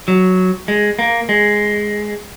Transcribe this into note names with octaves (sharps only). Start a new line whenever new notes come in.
F#3
G#3
A#3
G#3